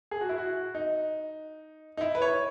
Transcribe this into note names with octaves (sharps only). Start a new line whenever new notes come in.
G#4
F#4
E4
F#4
D#4
D#4
E4
B4
C#5